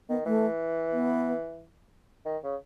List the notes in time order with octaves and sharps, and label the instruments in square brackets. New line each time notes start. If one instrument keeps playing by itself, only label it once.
[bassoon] D#3 [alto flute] B3
[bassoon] E3 [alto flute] A3
[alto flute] B3
[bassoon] D#3
C#3